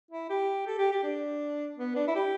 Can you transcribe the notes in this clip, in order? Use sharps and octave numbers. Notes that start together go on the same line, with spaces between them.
E4
G4
A4
G4
G4
D4
B3
D4
E4
G4